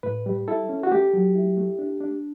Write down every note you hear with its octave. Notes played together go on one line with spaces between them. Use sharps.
A2 B4
G3
E4 A4
C#4
F#4
A3 G4
F#3
E4
A3
D4
D4